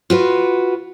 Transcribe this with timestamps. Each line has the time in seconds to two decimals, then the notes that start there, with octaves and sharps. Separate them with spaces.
0.10 F4 F#4 B4